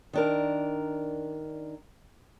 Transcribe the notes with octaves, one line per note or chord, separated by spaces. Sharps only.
D#3 D4 A#4